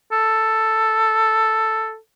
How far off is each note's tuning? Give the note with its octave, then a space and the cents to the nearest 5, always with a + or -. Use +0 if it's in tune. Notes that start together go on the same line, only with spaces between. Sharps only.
A4 +5